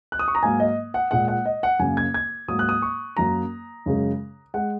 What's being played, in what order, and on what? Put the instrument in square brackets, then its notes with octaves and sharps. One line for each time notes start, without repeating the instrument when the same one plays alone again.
[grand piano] F#6
D#6
C#6
A#5
G#2 F#3 A#3 G#5
D#5
F#5
A#2 G#3 F#5
F#5
D#5
F#5
F#2 C#3 A#3 G#5
G#6
G#6
G#2 F#3 A#3 D#6
F#6
D#6
C#6
F#2 F#3 A#3 A#5
F#2 C#3 G#3
G#3 F#5